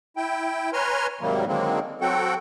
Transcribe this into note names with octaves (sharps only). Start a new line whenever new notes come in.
E4 G5
B4 C#5 G#5 A#5 C6 F6
G#2 C3 D#3 F#3 G3 A#3
D3 D#3 F#3 G#3 A#3 C4
F#3 C4 F#4 A4 F#5 G5